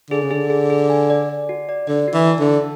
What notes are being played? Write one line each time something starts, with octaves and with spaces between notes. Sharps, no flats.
D3 G#4
C#3
D3 G#4
G#4
G#4
G#5
D5
D5
F#4
D5
D3 D5
F#4
E3
A5
D3
A5